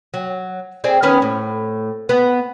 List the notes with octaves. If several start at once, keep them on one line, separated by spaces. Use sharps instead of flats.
F#3
C4 G#4 D5
D#3 B3 C#4
A2
B3